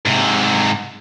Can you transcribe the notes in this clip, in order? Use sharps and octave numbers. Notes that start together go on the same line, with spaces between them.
G#2 C3